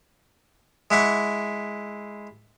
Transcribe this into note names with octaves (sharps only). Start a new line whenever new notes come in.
G#3 E4 F#5 C#6